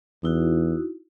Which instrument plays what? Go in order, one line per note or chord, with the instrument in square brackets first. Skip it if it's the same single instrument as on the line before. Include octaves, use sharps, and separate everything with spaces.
[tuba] E2 [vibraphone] D#4 E4 F#4